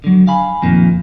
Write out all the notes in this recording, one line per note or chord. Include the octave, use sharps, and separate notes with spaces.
D3 F#3
F5 G#5 B5
F2 A#2 D#3